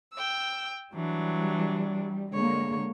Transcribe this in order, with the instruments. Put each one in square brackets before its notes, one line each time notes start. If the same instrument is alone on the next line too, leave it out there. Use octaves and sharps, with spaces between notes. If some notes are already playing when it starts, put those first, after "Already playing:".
[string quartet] G5 E6
[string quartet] E3 F#3 D4 [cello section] G3
[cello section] D3 G#3 A#3 [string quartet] C#5